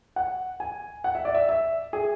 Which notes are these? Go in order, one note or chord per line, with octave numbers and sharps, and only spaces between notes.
F#5
G#5
F#5
E5
D5
E5
E5
G#4